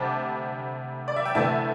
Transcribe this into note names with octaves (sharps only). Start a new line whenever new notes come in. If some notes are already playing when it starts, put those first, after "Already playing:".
Already playing: D2 C3 G3 C4 A5 D6
D5
E5
G5
D2 C3 E3 A3 E5 A5